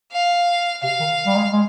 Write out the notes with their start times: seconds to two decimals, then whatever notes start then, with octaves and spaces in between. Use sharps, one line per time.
0.12 F5
0.83 C3 F5
1.00 D#3
1.27 G3
1.36 G#3
1.53 G#3